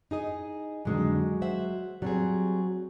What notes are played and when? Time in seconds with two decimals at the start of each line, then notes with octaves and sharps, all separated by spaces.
0.11 D#4 G#4 D#5
0.85 F2 D3 D#3 F#3 G#3
1.42 C5 E5 F#5
2.02 F#3 G3 C4 G#4